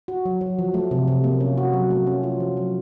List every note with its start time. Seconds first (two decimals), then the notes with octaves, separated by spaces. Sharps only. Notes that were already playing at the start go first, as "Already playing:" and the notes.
0.08 F#4
0.25 F#3
0.41 F#3
0.59 F3
0.74 A3
0.91 C3
1.08 C3
1.24 A#3
1.40 C#4
1.58 F#4
1.73 F#3
1.91 A3
2.07 C#4
2.23 F4
2.40 F3
2.57 F#3